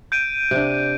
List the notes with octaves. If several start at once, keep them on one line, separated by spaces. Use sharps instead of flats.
G6 D7 D#7
C3 D4